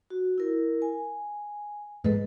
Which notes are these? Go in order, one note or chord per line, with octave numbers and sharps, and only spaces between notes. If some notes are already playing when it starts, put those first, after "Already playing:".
F#4
E4 A#4
G#5
G#2 G#3 A4 B4